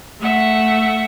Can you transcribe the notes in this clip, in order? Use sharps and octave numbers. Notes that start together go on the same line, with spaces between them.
A3 E5 F#5